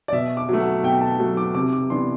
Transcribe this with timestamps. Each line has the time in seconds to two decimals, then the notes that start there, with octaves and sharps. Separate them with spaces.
0.08 D5
0.12 B2 E5
0.37 D6
0.49 F#3 A3
0.60 F#5
0.84 B2 G5
1.01 A5
1.19 F#3 A3
1.37 D6
1.55 C3 D6
1.73 D6
1.90 E3 B3 D4 C6